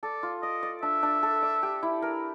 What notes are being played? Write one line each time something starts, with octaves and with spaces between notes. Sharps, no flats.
A4 D5
F4
D5 D#5
D5
D4 E5
D4
A4
D5
G4
E4
A#4